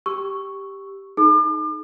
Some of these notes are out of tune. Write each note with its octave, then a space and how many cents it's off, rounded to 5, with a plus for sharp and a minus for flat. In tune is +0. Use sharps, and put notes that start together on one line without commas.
G4 +0 C#6 +0 E6 +0
D#4 +0 G#4 +45 D6 +40